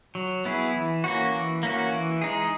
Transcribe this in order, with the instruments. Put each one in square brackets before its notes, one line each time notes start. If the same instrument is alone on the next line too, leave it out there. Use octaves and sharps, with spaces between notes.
[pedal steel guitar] F#3
B3 E4 G#4
E3
A#3 C#4 F#4
E3
A#3 C#4 F#4
E3
G#3 D#4 G#4